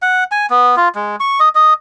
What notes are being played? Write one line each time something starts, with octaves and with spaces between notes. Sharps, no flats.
F#5
G#5
B3
F4
G#3
C#6
D#5
D#5